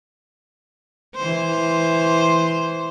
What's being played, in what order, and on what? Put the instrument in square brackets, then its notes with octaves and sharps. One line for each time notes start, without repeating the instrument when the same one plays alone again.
[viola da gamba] E3 C5